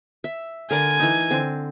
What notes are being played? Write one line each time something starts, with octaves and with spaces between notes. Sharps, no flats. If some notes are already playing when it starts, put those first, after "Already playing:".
E5
D3 A#4 D5 G#5
E3 D#4
D3 C4